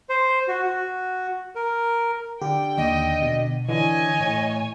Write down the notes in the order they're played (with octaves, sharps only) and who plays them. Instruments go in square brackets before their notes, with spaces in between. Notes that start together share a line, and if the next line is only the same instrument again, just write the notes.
[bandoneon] C5
F#4
F#4
A#4
[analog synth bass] D3 [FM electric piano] G4 [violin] G5
[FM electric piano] D#2 [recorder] D#5
[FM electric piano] B2
[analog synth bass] D3 [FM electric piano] E3 [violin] C#5 G#5 [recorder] D#5
[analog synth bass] A2